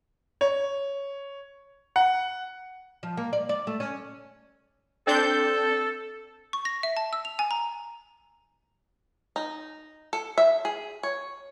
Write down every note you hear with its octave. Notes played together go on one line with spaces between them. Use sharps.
C#5
F#5
F3
A#3
D5
D5
A3
C#4
C4 D4 A4 G6
C#6
A#6
E5
A5
E6
F7
G#5
A#5
D#4
A4
E5
G#4
C#5